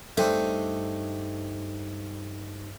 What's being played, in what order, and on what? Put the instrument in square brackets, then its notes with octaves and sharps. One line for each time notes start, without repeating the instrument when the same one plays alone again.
[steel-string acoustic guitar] G2 D#4 [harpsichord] A3 C4 D4